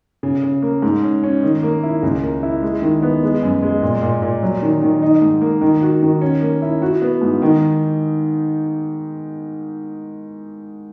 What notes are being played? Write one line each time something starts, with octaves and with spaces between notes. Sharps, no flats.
C#3
C#3
A#3
G#2
C#4
C#4
D#3
A#3
E4
C#2
A#3
E4
G#3
D#3
B3
G#3
F#2
G#3
A#2
A#2
A#2
F#3
D#3
D#3
D#4
G#2
A#3
D#3
F#4
D#3
C#4
A#3
E4
F#4
B3
G#2
D#3